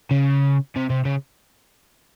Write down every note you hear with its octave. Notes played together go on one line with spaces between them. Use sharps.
C#3
C3
C3
C#3